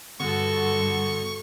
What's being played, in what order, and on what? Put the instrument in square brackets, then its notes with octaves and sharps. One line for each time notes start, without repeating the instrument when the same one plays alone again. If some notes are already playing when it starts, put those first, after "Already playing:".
[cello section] G2 [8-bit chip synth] D3 B3 [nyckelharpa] F#4 A4 [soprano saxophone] C#6